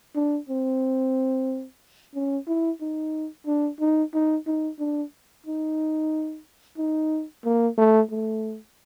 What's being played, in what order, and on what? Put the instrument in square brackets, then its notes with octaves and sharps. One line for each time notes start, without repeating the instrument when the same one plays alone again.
[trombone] D4
C4
C#4
E4
D#4
D4
D#4
D#4
D#4
D4
D#4
D#4
A#3
A3
A3